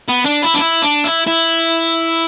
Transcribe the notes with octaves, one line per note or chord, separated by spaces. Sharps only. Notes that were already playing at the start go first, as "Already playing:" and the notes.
B3
D4
E4
D4
E4
D4
E4
E4